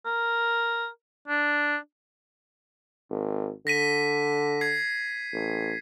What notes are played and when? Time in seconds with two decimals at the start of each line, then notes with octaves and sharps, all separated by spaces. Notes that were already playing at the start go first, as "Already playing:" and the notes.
0.06 A#4
1.28 D4
3.10 G#1
3.67 D3 A#6 B6 D#7
4.61 G#6 C7
5.33 A1